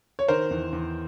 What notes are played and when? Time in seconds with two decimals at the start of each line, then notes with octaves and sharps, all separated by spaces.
0.19 C#5
0.28 D#3 A#4 C5
0.51 E2
0.73 E2